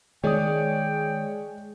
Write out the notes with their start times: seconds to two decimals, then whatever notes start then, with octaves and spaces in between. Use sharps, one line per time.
0.24 D#3 G#3 C#5 D5 G5 D#6